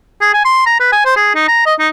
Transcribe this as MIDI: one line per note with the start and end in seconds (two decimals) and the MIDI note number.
0.21 0.34 68
0.34 0.45 80
0.45 0.62 84
0.66 0.79 82
0.80 0.91 71
0.92 1.04 80
1.05 1.13 72
1.16 1.31 68
1.35 1.43 63
1.48 1.62 82
1.66 1.74 75
1.79 1.88 63